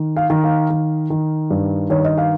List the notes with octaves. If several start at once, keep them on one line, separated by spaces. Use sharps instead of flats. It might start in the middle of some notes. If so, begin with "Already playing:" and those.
Already playing: D#3
F5
D#3
F5
D#3
D#3
G2
D#3 C#5
D#5
F5